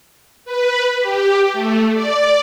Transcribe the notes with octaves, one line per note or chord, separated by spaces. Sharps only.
B4
G4
A3
D5